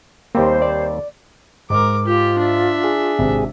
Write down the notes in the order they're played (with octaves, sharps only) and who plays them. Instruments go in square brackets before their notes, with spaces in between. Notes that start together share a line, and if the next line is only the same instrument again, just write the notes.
[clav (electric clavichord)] D#2 G3 C4 [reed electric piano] A#3 [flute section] C5
[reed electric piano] D5
[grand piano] G#2 [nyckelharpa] A#4 D6
[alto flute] F4 [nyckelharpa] G4
[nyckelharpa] D4 E5
[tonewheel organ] G#4
[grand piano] G#1 C3